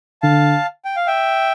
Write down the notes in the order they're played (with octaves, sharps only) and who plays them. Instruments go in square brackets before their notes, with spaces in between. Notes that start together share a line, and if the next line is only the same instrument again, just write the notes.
[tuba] D3 [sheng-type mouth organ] F5 A5
[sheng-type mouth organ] G5
F5
E5 G5